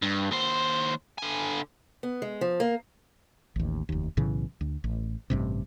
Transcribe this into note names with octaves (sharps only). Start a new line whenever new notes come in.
G2
D#2 C5
D3 G#5
B3
G#3
F3
A#3
A1 D#2
F1 D#2
B1 A2 C#3 E3
D2
A1
A1 G2 C3